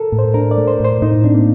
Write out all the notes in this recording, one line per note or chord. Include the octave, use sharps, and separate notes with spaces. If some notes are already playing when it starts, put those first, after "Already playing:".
Already playing: A4 A#4
A2
C5
D4 A#4
D5
A3
C5
A2 C5
A2 D#4
C4 D4
A#3